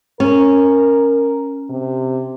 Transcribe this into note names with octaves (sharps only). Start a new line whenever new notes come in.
C#4 A#4
C3